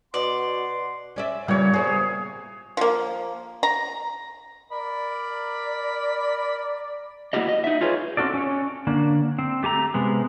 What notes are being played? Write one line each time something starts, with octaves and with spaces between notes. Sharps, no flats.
B2 D5 F#5 C6
C#4 D5 E5
A#2 C#3 G3 B3 C#5
B3 C4 E4 G#4
F3 A#3
A#5
A#4 D5 B5
A#3 E4 F#4 G4 D#5
D#5
D#4 E5
D#4 F4 G#4 B4 C#5
C4 C#4 F#4 A4 D5
C#4 C#5
D3 A#3 D4
C4
A3 G4 G#5 A#5
C3 G#3 B3